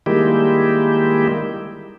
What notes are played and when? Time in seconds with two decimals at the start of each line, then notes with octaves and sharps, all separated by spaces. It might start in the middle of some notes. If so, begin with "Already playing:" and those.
0.06 D#3 G3 G#3 A#3 E4 G4